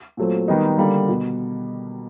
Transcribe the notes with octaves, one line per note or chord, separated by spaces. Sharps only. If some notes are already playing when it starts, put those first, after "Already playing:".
A#2 F#3 A3 C4
D#3 G3 B3 D#4
D3 G3 A#3
B2